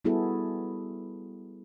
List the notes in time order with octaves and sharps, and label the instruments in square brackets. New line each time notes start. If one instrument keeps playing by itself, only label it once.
[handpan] G3 B3 E4 F#4 G#4 A4